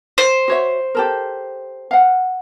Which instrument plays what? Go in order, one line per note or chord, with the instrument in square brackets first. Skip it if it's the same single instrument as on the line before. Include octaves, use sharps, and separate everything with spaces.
[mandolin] C5
[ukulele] F#4 C#5 E5
G4 A4 A#4
F5 F#5